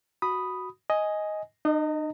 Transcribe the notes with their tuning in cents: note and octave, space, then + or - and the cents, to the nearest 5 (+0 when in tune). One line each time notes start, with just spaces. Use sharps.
F#4 +0 B5 +0 D#6 +0
D#5 +10 G#5 +0
D#4 -45 D#5 +0 A#5 -40